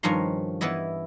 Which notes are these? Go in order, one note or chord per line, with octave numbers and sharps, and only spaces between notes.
G2 D#3 F3 C#4 A#5 C6
E3 B3 E4 D#5